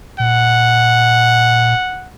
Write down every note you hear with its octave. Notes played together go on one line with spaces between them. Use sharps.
A#2 F#5